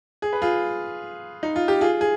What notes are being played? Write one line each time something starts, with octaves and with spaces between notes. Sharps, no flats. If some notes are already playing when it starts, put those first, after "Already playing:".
G#4
B4
F4 G#4
D#4
F4
G4
F4 G#4
G#4